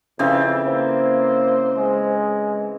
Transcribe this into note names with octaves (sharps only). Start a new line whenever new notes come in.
F2 C#3 E3 C4
A#3 C5
G#3